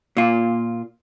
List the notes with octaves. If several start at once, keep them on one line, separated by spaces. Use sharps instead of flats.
A#2 F4